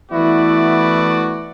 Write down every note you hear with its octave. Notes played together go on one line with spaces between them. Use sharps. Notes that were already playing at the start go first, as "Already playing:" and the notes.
E3 A3 B3 E4 F#4 D5